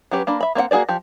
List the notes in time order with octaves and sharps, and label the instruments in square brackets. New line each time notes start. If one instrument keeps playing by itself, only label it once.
[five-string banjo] F#3 C#4 G4 B4
A#3 D4 B5
E5 B5
A#3 C4 D5 F#5
A#3 F#4 G#4 C5 D5
F3 G4